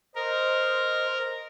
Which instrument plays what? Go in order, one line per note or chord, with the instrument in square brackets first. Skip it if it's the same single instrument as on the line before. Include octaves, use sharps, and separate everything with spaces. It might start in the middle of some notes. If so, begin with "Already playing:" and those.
[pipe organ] A#4 [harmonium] C5 D#5